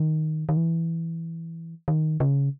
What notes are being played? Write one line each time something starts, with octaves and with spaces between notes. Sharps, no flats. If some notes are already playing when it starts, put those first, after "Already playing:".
Already playing: D#3
D#3
E3
D#3
C#3